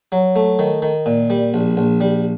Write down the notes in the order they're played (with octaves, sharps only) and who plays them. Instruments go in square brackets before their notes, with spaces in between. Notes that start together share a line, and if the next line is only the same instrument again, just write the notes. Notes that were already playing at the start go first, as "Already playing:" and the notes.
[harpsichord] F#3
A3
D#3
D#3
A#2
G3
A#1
A#1
G3